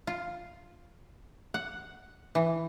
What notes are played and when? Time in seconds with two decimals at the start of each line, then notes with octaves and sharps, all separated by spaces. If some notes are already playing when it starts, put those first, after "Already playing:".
0.07 F4
1.54 F#5
2.35 E3